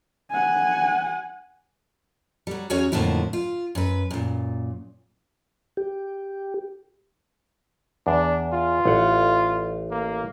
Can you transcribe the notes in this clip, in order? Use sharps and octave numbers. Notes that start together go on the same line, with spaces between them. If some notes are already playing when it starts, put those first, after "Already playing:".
F#5 G#5
F#3 G3
E2 C#4 F#4 G#4 C#5 G#5
F2 A2 D3 F3 A#3 E4
F4
F#2 B4
F#2 A#2
G4
E2 D4
F4
A1 F#5
A#3